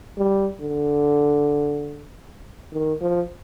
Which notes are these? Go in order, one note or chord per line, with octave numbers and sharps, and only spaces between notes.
G3
D3
D#3
F3